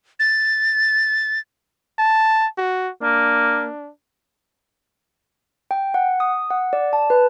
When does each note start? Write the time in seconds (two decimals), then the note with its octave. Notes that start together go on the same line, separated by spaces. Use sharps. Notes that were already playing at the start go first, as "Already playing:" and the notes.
0.20 A6
1.99 A5
2.58 F#4
3.03 A#3 D4
5.71 G5
5.94 F#5
6.20 D#6
6.50 F#5
6.73 D5
6.93 A5
7.10 B4